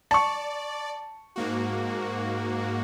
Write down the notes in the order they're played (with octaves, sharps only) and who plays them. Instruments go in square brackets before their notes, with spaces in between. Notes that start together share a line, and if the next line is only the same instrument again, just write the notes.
[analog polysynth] D5 [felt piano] A5 C#6
[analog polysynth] G#2 A#3 F#4